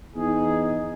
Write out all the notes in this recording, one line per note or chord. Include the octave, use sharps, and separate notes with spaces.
E2 D#4 G#4